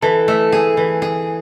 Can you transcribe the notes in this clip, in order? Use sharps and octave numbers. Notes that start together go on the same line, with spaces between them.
E3 A4
A3
G#4
E3
G#4